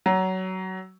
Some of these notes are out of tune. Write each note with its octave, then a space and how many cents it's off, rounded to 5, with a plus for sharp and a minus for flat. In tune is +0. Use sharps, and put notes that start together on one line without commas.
F#3 +20